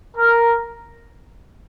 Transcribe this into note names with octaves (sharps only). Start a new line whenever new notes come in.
A#4